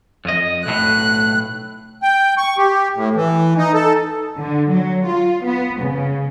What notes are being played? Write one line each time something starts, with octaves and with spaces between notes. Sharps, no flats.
F2 D#5
B1 A2 F#6
G5
C#6
G4
A2
E3
D#4
A4
D3
F#3
F4
B3
C#3